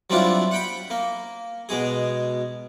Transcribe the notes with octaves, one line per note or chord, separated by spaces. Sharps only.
F#3 G3 C4 D4 E4 F4
F#5 G5 B5
A#3
B2 G#3 G#4